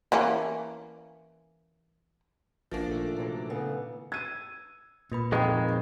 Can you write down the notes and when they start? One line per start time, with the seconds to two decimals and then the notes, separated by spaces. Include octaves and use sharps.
0.12 E3 A#3 C#4
2.72 A1 F3 A#3 D4
2.88 A#2 D#3 A3 A4
3.16 C3 E3 F#3
3.33 A4
3.50 C#3 B3
4.12 E6 G#6 D#7
5.12 A#2 A#3 B4 B5
5.32 F2 D#3 G#3 A4 B4 G5 B5 A6